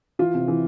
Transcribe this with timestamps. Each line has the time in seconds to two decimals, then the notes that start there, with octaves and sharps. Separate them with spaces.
0.19 E3 F4
0.34 C3
0.48 E3